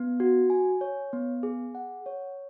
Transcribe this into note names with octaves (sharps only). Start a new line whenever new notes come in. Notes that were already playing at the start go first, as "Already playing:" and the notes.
Already playing: B3
F#4
G#5
C#5
B3
G#4
F#5
C#5